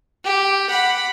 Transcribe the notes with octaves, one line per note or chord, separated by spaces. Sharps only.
G4
F#5 B5